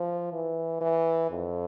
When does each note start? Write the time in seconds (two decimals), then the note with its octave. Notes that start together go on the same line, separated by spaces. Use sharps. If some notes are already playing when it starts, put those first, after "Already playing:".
Already playing: F3
0.32 E3
0.81 E3
1.30 F2